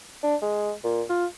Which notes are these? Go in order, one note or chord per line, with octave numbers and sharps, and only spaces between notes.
D4
G#3
A#2
F4